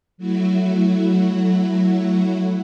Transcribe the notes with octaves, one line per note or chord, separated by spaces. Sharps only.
F#3 A3 E4 F#4